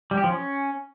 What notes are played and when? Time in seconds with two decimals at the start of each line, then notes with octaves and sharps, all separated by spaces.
0.11 G3
0.17 G4
0.24 F3
0.30 C#4